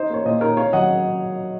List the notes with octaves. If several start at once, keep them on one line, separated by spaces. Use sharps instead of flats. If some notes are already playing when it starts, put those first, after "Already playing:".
Already playing: D#4 C5 D#5
A#3 C#5
A#2 C5 D#5
D#4 A#4 C#5
C4 C#5 F5
F#3 D#5 F#5